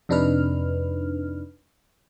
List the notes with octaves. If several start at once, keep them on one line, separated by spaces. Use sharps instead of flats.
F2 C3 D4 D#4 B4 F6